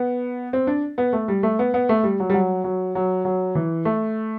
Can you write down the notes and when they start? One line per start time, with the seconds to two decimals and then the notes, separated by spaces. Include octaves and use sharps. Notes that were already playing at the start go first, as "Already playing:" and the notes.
Already playing: B3
0.53 C4
0.67 D4
0.98 B3
1.13 A3
1.28 G3
1.43 A3
1.59 B3
1.74 B3
1.89 A3
2.04 G3
2.20 F#3
2.30 G3
2.34 F#3
2.64 F#3
2.95 F#3
3.25 F#3
3.55 E3
3.85 A3